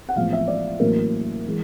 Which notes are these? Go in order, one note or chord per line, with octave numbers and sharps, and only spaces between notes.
F#5
A1 A2 F3 G#3 B3 F5
E5
D5
A1 A2 F#3 A#3 A#4
E3 G#3